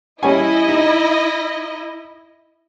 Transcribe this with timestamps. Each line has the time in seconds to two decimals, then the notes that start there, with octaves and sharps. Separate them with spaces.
0.23 G3 C#4 E4 D#5 G#5
0.69 D#4